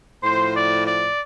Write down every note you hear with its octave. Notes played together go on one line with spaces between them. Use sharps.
A2 F3 C5
D5
D5